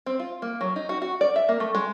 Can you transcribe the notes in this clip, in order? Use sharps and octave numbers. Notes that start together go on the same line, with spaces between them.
C4
F4
A#3
F#3
D#4
F#4
F#4
D5
E5
A#3
A3
G#3